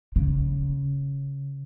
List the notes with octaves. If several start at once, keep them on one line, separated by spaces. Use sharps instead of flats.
C#3